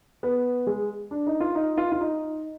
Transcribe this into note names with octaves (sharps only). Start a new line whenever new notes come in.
B3
G#3
D4
D#4
F4
D#4
F4
F4
D#4